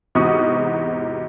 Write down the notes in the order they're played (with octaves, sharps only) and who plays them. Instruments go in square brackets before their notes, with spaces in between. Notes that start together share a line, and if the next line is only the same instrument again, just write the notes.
[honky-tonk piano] E2 G#2 C3 F#4 C#6 D#6